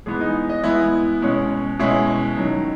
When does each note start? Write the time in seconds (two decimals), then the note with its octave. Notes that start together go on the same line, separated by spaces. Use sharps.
0.06 E3 G#3 B3 G#4
0.21 D#4
0.49 D#5
0.64 E3 G#3 B3 E4
1.22 B2 G#3 C#4
1.79 B2 G#3 C#4 E4
2.37 D#3 F#3 C#4